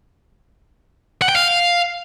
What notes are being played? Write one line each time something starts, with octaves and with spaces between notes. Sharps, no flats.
F#5
G5
F5